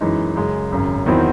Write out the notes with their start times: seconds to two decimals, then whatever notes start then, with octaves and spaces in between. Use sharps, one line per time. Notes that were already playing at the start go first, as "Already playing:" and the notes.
0.01 F#2 E3 G#3 D#4
0.36 F#2 C#3 G#3
0.71 G#1 F#2 C#3
1.06 E2 D#3 F#3 C4 E4